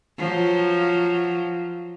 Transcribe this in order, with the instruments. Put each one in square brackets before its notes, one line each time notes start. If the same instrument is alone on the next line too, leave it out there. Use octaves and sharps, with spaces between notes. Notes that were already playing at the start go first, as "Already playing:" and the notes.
[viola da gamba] F3 F#3